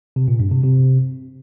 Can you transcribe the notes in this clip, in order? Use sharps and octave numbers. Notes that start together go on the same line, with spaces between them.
C3
A#2
G2
C3
C3